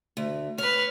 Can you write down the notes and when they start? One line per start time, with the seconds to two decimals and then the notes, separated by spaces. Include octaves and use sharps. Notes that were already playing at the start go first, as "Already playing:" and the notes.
0.17 D2
0.58 B4 C#5 F6